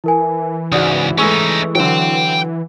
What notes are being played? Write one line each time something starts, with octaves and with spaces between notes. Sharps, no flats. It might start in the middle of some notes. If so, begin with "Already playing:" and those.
E3 E4 A#4 G#5
C#2 G#2 F#4 D5 D#6
G#3 A3 C#4 D#4 C#6 E6
D3 F#3 G5 C6